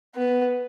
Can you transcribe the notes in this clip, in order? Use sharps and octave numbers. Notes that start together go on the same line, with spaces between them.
B3